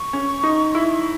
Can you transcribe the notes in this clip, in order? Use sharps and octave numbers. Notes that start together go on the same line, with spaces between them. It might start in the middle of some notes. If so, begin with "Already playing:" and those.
Already playing: C#6
C#4
D#4
E4